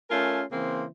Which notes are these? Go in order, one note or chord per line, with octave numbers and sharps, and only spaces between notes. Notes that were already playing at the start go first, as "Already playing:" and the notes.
A3 C#4 F4 A#4 G#5
C#3 E3 A#3 C4 C5